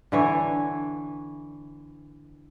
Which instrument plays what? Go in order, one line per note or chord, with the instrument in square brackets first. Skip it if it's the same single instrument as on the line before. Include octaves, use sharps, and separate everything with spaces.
[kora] D3 E3 C#5